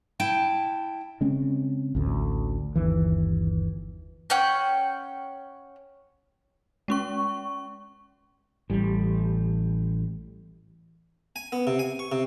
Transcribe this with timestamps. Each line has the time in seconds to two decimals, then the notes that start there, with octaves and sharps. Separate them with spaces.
0.20 E4 G5 A5
1.21 C#3 G#3 C4 C#4
1.95 A1 D2
2.75 G1 D#2 E3
4.30 C#4 F#5 G5 G6
6.88 G#3 C#4 C#6
8.70 A1 G3
11.36 G#5
11.52 B3
11.67 C3
11.79 G#5
11.99 C#6
12.12 C3